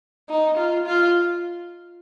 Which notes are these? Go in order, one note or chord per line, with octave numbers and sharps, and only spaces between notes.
D#4
F4
F4